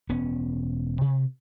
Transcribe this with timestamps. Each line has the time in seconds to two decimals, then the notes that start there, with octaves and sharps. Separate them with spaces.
0.09 E1 B3 C#4
1.01 C3